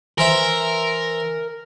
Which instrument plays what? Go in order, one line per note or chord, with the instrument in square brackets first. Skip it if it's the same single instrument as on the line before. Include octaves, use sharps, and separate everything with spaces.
[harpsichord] E3 C5 E5 [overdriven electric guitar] A#4